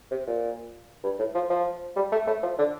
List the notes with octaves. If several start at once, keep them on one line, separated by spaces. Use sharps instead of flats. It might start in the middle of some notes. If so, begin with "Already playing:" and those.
C3
A#2
G2
A2
F3
F3
G3
A3
A3
F3
D3